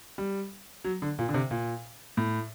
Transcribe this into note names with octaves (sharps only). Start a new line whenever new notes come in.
G3
F#3
D3
A#2
D3
C3
A#2
A2